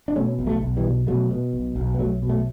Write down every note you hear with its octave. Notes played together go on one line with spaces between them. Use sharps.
D4
B2 A3 C#4
B1
F#3 A3
B1
E3 G3
B2
B2 F#3 A3
B2
B1
B1
B3
B1 F#3 A3
B2
F#3 A3